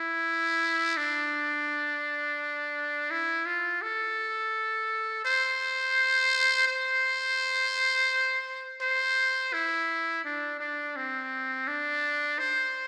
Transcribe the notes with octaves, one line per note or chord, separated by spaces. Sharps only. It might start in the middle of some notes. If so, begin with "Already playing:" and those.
Already playing: E4
D4
E4
F4
A4
C5
C5
C5
E4
D4
D4
C4
D4
C5